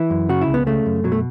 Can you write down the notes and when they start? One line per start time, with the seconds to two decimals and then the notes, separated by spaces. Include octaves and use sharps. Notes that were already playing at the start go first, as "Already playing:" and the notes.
Already playing: E3 E4
0.10 F#2
0.29 C#3 F#4
0.41 E4
0.48 C#2
0.54 B3
0.67 C#3 A3
0.86 F#2
1.04 B2 F#3
1.12 A3